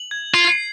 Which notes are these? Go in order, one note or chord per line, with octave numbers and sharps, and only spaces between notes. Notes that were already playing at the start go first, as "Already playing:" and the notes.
Already playing: F#7
G#6
F4 C7